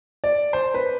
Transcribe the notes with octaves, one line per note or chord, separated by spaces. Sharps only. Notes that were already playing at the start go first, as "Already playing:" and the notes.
D5
C5
B4